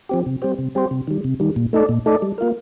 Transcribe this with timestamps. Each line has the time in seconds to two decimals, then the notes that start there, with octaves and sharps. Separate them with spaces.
0.09 F3 C4 G4
0.26 C3
0.42 G3 C4 G4 C5
0.58 C3
0.75 G3 C4 G4 C5
0.91 C3
1.08 D#3 G3
1.24 C3
1.40 D#3 G3
1.56 A#2
1.73 A3 D#4 A4 D5
1.89 A#2
2.06 A3 D#4 A4 D5
2.22 G3
2.38 A#3 F4 A#4